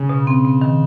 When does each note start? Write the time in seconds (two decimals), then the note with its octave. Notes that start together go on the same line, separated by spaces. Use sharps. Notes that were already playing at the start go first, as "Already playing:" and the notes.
Already playing: C#3
0.09 B2
0.27 C4
0.45 C4
0.62 D#3